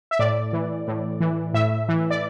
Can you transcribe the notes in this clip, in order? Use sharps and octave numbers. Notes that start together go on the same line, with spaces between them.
E5
A2 D5
E3
A2
E3
A2 E5
E3
D5